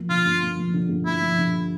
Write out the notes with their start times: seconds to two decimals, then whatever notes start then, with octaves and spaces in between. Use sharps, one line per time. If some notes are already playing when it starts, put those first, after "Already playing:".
Already playing: F3 A#3
0.09 D3 F4
0.26 G2
0.42 A#3
0.57 F3
0.74 D3
0.89 G2
1.06 A#3 E4
1.22 F3
1.38 D3